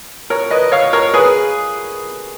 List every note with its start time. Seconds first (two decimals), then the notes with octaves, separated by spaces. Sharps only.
0.30 A#4 C#5
0.51 B4 D#5
0.72 C#5 F5
0.93 A#4 C#5
1.14 G#4 B4